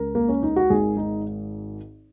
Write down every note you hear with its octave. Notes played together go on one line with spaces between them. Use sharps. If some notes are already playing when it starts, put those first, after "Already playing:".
Already playing: C#2 C#3 A#4
A#3
C#4
D#4
F#4
G#1 G#2 D#3 G#4
D#4